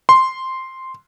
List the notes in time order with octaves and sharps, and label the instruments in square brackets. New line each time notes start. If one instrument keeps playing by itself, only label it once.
[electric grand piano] C6